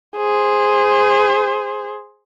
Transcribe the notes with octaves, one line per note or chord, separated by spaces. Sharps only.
G#4 C5